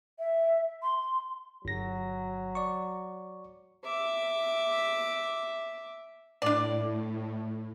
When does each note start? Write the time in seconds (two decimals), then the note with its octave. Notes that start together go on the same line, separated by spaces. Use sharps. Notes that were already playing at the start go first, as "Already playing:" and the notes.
0.19 E5
0.83 C6
1.65 G1 F#3 A#6
2.55 D5 C#6
3.84 E5 D6
6.42 A2 D4 D5